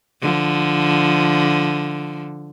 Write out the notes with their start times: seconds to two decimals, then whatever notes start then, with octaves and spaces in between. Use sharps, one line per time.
0.22 D3 F3